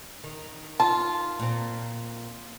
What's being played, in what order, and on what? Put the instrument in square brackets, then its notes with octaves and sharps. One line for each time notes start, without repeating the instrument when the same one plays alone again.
[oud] D#3
[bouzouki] F4 [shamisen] A5
[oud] A#2 C4